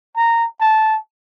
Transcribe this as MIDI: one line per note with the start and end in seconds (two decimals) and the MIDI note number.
0.17 0.46 82
0.61 0.98 81